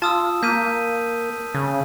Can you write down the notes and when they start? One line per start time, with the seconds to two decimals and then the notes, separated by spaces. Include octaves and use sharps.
0.02 F4 A5 D#6 E6
0.43 A#3 G6 B6 D#7
1.55 C#3